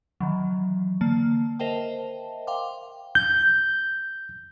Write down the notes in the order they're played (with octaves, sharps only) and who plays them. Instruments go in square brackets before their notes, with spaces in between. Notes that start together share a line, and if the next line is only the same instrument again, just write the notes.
[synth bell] D#3 E3 F#3
D3 A#3 A5
A#4 C5 D#5 E5 G5 A5
F5 G5 C6 D6
[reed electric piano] G6